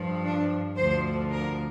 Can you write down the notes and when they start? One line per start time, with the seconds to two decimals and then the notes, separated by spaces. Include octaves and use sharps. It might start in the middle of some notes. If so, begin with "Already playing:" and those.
Already playing: G2 F3
0.25 D4
0.77 D2 D3 F3 C5
1.30 A#4